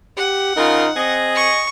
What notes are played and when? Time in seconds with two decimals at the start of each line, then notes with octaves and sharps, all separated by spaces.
0.17 G4 F#5
0.56 C#3 D#4 F4 A#4
0.97 C4 G#4 D#5
1.35 C#6